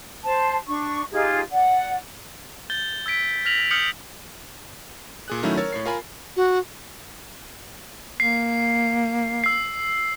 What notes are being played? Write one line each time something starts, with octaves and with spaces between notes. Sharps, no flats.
C5 A5
D4 C#6
D#4 F4 G4 G#4
D5 F#5
G6 A6 G7
E6 G#6 B6 D7
F6 A#6 B6 F7 F#7
D#6 F6 G6 B6 C#7 F#7
A#2 G#4 F#6
D#3 F#3 A3 C#4 D#4 E4
A#4 C#5 E6 A6
A2 C#5 C7
F4 A#4 G#5 B5
F#4
A#3 C7
E6 C7